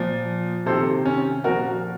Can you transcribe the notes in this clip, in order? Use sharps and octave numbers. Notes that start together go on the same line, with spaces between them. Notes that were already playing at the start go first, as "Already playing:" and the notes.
Already playing: A#2 F3
C3 D#3 A4 C5
C#4
A#2 F3 F#4 A#4